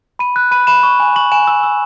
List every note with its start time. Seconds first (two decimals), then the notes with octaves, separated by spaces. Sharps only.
0.19 B5 D#7
0.36 F#6
0.51 B5 D#7
0.67 B5 E7
0.83 C#6
1.00 G#5
1.16 C#6 F#7
1.32 G#5 E7
1.47 E6
1.63 E6